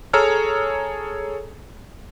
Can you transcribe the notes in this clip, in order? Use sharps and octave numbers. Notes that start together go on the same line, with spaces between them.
G#4 A4 C#5 A#5 E6 F6